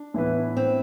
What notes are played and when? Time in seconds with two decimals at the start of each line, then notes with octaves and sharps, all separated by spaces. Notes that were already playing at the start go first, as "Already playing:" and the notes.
Already playing: D4
0.14 A2 E3 B3 E4 B4
0.57 C4